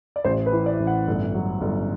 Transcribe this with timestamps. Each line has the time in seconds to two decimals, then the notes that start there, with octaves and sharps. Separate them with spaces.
0.16 D5
0.24 A1 C5
0.46 B4
0.52 E3
0.66 D5
0.80 A1
0.87 F#5
1.07 G1
1.34 F#3
1.61 G1